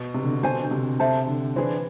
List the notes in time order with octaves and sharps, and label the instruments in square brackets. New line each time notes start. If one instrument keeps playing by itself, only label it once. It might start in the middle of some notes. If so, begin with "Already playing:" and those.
Already playing: [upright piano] B2
C3
D3
C3
[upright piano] B2 [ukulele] A4 C5 G#5
[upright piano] D3
C3
[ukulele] A4 C5 E5 A5
[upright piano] D3
[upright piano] E3 [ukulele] D4 G#4 C5